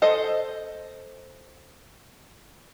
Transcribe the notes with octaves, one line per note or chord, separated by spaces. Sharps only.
A4 C5 D#5